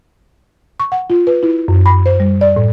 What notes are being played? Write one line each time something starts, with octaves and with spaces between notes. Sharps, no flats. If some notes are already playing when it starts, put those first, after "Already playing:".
C#6
F#5
F4
B4
E4
F#2
B5
C5
G3
D5
A2